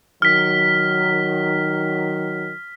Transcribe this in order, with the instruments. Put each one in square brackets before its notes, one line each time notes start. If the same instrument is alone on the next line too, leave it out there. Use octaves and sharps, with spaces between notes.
[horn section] D#3 F#3 [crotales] F6 B6